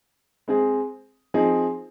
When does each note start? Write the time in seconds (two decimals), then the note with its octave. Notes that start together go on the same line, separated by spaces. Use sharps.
0.48 G#3 C4 G#4
1.34 F3 C4 D#4 G#4